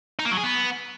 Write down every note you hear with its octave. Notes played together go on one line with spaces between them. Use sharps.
D#4
A#3
F#3
G#4
B3